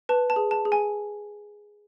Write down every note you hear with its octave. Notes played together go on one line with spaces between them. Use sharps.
B4 A5
A5
G#4
A5
G#4
G#5